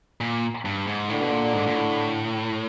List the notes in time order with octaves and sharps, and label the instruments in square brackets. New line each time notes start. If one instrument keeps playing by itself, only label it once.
[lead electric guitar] A#2
G2
G#2
[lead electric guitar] A2 [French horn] D3
[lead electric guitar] B2
A#2
G#2
A#2
A2